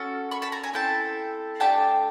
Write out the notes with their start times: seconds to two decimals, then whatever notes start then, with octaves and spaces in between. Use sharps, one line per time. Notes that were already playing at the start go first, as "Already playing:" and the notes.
Already playing: C#4 F#4 A4
0.31 B5 C#6
0.42 A5 B5
0.52 G#5 A#5
0.64 G#5 A#5
0.73 C4 E4 A4 G5 A5
1.60 A3 D4 G4 G5 A5